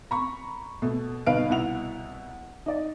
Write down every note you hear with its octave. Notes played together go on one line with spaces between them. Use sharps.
A#5 B5 C#6
B2 A3
G1 B2 D#4 B4 F5 D7
C2 B2 E4 F#5 F7
D#4 D5